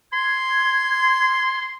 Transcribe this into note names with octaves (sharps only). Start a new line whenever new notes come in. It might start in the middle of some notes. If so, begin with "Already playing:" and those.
C6 G#6